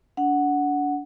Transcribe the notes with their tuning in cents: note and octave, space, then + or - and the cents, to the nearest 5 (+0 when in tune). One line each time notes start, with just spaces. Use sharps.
D4 -30 F#5 +0